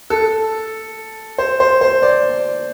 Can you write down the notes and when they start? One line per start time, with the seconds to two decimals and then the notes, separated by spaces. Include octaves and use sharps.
0.10 A4
1.38 C5
1.60 C5
1.81 C5
2.02 D5